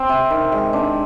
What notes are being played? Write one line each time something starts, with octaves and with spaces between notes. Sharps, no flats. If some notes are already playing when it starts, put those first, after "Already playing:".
Already playing: C4
C3
D#3
G#3
C4 D4